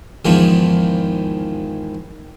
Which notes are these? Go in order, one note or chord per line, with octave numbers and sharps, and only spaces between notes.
E2 G#2 D#3 F3 G#3